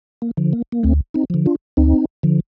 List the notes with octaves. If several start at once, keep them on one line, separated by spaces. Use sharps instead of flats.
A#3
D3 F3
A#3
A#3
D2 A3 C4
C4 D#4
D3 F3
D4 F4
D2 C4 D#4
D3 F3